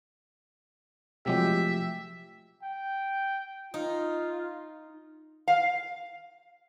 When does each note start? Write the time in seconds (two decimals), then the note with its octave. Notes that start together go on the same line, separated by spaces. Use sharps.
1.26 C3 F3 F#3 G#3 A3 F4 G4 E5
2.63 G5
3.74 D#4 F4
5.48 F5